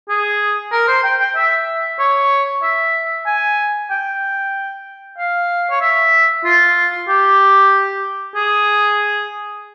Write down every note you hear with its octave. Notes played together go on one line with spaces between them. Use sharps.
G#4
A#4
C5
G5
G5
E5
C#5
E5
G#5
G5
F5
C#5
E5
F4
G4
G#4